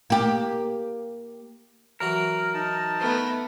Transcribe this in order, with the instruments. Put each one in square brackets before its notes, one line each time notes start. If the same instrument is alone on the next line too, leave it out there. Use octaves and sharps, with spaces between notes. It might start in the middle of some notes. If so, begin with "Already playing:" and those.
[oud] A#3 G4
[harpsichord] E3 F#3 F#4 [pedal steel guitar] A#4
[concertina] D#4 A5
[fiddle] A3 B3